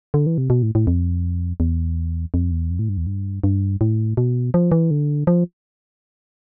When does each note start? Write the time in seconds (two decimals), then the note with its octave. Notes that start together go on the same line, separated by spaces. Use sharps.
0.14 D3
0.26 E3
0.38 C3
0.50 B2
0.63 A2
0.75 A2
0.87 F2
1.60 E2
2.34 F2
2.52 E2
2.71 F2
2.79 A2
2.89 G2
2.97 E2
3.06 G2
3.44 G2
3.81 A2
4.17 B2
4.54 F3
4.72 E3
4.91 D3
5.27 F3